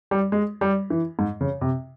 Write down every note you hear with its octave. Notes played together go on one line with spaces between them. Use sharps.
G3
G#3
G3
E3
G#2
C#3
C3